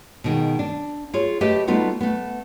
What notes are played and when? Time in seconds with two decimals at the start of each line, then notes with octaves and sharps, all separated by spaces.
0.24 B2 D#3 G#3
0.59 D4
1.14 F4 G#4 C#5
1.41 A3 G4 B4 D#5 E5
1.67 G3 A3 B3 D#4 F4 F#4
2.01 A3 B3